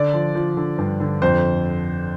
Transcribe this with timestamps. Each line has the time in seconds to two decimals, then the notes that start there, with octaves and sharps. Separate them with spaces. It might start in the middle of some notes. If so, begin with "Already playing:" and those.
Already playing: D3 D5
0.14 F3
0.35 F3
0.57 D3
0.78 G2
1.00 D3
1.22 F2 C5